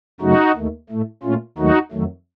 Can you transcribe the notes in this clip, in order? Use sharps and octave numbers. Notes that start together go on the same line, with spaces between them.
F#2 C#3 F#3 A3 D#4 F#4
D#2 D#3 A3
A2 A3
A#2 A3 C#4 F4
D#2 D#3 F#3 A3 D#4 F#4
F2 D#3 F#3 A3